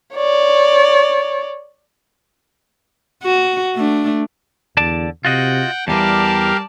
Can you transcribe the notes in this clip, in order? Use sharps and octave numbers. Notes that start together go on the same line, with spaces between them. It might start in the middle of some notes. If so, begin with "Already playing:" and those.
C#5 D5
F#4
A3 D4
E2 D3 D5 A5
C3 F4 F#4 D#5 F#5 G5
E2 E3 G3 G4 A#4 D5 F5 A5